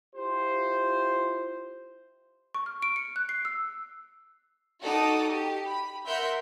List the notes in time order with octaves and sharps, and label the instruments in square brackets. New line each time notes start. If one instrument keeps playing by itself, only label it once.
[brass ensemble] E4 F4 G4 C5
[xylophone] C#6
F6
D7
C#7
F#6
C7
E6
[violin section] D#4 F#4 A4 A5 D6 D#6
G4
B5
A#4 E5 F#5 C6 F#6 G6